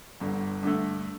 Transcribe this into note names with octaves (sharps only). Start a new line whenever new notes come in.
G1 G2 D3
G2 D3 A3